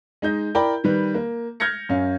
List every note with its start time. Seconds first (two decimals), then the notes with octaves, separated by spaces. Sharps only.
0.22 G#3 D#4 G6
0.55 E4 A#4 D5 G5 B5
0.84 D#3 G3 B4
1.15 A#3
1.60 F6 G6 G#6 A#6 C#7
1.89 F#2 C#4 F5